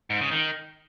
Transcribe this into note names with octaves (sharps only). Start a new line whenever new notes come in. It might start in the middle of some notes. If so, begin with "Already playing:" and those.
G#2
C#3
D#3